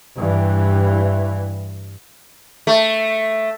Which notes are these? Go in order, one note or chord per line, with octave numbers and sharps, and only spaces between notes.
G2 E3
A3